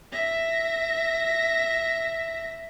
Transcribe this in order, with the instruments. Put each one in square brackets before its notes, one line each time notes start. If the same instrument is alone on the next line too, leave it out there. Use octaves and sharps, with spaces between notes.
[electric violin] E5 A#6